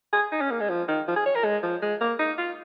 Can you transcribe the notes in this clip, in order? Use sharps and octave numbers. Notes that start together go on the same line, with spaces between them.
G#4
D#4
C#4
A#3
G#3
F3
D#3
F3
G#4
C#5
A#4
G#3
F3
G#3
A#3
D#4
F4